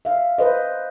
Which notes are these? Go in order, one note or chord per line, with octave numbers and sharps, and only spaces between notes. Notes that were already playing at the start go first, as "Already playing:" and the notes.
E5 F5
B4 C5 D#5